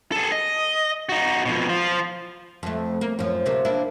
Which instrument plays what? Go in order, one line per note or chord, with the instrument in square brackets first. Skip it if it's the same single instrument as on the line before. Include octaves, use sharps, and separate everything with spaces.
[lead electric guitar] G#4 A4
D#5
D#4 F#4
F2 B2
F3 F4
[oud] F2 A3
A#3
F#2 F3
D2 C3 A#3
A#3 D4 E4